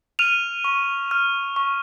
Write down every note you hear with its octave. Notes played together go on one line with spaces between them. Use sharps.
F6 D#7 F7
C#6
F6
C#6